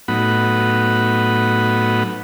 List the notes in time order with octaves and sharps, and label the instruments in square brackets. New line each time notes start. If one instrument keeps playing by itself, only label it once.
[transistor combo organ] A2 F#3 B3 D#4 F#5 B5